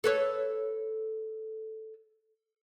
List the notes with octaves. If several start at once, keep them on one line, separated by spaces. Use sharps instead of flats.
A4 B4 C#5